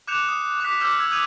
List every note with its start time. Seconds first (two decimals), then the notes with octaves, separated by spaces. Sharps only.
0.07 D6 F#6 G6 C#7 E7 F7
0.28 D#6
0.60 D6 F#6 B6
0.80 D6 E6 F6 G6
0.98 E6 G#6
1.11 D#6 G6 G#6 D#7 F7